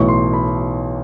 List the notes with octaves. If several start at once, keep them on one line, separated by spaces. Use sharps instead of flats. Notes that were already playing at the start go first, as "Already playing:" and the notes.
Already playing: B1 A2 E3 C#6
C6
B5